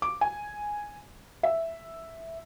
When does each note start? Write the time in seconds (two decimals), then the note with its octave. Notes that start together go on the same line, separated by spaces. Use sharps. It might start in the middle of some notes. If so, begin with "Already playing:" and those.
0.02 D6
0.21 G#5
1.43 E5